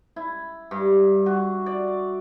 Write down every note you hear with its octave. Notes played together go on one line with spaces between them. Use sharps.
E4
G2
F#4
D5